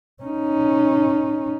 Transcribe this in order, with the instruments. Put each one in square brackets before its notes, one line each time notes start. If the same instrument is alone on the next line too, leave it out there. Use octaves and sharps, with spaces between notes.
[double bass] C#4 D#4